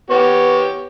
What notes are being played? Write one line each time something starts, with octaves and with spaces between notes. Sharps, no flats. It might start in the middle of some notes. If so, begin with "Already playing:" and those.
B3 G4 C#5